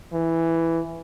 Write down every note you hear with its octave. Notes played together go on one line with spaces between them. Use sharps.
E3